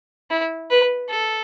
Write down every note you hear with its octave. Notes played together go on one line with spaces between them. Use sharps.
E4
B4
A4